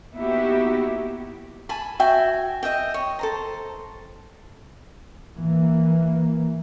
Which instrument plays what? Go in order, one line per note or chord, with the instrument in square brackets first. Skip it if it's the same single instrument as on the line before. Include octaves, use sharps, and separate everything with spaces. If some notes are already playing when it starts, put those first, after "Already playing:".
[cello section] A#3 B3 D#4 E4 F#4 G4
[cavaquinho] G#5 A5 B5
F#4 E5 G5 G#5
D#5 E5 G5
C#5
A4 C5 A#5
[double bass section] E3 A#3